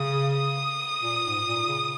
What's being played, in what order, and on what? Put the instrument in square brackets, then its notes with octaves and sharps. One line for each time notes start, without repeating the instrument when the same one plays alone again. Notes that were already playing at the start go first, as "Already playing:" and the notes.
Already playing: [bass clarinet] C#3 [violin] D#6
[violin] D#6
[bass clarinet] A#2
G#2
A#2
C#3